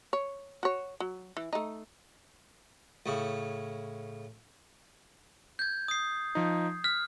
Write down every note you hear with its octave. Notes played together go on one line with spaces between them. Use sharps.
C#5
F#4 C#5
F#3
E3
A3 D#4
A2 C#3
G6 G#6
D#6 C7
F3 D#4
F6 B6